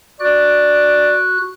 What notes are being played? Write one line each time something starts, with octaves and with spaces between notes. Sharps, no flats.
F#4 D5 F#6